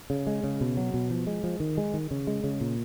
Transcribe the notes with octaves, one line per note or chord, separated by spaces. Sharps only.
C#3
G#3
C#3
B2
F#3
B2
F3
G#3
F3
D#3
G#3
D#3
C#3
G#3
C#3
A#2